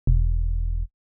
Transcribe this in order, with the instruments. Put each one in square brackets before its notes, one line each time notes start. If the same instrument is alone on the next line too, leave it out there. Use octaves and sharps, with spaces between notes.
[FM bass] E1